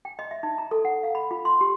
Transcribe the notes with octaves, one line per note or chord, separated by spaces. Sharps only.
G5
D#5
E5
D#4
A#5
A4
F#5
F5
B5
F4
C6
G4